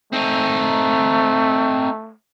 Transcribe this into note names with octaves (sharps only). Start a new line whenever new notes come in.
A3 C4 D#4